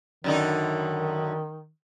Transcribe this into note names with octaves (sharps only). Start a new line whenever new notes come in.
F#2 D3 D#3 D#4